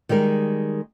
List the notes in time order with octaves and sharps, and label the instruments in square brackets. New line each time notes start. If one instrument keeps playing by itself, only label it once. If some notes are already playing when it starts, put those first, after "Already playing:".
[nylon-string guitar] D#3 G3 G#3 A#4